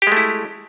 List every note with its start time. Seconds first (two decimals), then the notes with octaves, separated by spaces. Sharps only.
0.02 G4
0.07 G#3
0.12 A3
0.17 E4